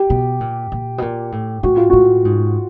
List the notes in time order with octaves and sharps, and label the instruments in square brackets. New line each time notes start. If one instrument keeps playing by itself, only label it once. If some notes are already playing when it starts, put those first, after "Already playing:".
Already playing: [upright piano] G4
[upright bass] B2
A#2
A#2
B2
A#2
A2
[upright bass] A2 [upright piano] F#4
[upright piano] F4
[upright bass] A2 [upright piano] F#4
[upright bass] G#2